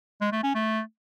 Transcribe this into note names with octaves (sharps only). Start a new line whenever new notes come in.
G#3
A3
C#4
A3